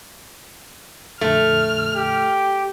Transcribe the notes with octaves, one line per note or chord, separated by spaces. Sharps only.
F2 A#2 D3 A3 F6
G4